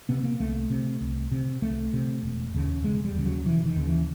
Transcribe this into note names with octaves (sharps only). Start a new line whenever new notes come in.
C3 B3
A#3
C2 A3
C3
C2
C3
C2 A3
C3
E1
D#2 C#3
E1 G#3
G3
D#2 C#3
F#3
E1 E3
D#3
D#2 C#3
E3